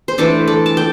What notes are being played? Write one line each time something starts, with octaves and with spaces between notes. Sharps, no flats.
C5
E3 A3 D4 A4 D5
A4 D5
A5
D5 G5